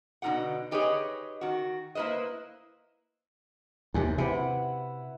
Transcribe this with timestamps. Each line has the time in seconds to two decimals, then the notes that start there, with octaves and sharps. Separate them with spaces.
0.22 B2 D3 D#4 F4 G4 F#5
0.71 D#4 G4 G#4 B4 C#5 D#5
1.41 D#3 F#4
1.95 A#3 E4 B4 C5 D#5
3.94 D#2 C3
4.18 C3 E4 B4 F#5